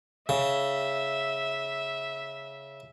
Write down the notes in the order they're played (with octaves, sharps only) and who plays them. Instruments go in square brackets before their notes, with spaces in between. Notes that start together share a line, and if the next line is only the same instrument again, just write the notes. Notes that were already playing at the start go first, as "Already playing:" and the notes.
[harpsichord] C#3 [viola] E5